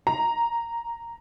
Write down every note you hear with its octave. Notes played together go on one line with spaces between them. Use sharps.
A#5